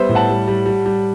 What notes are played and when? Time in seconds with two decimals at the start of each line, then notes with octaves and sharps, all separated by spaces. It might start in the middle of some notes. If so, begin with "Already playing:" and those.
Already playing: G3 B3 C5 E5
0.09 A2
0.15 F#5 A5
0.29 G3
0.48 G3
0.66 G3
0.86 G3